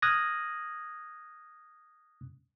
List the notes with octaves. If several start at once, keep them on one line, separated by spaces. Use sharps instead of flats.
D#6 F6 F#6 G#6 A#6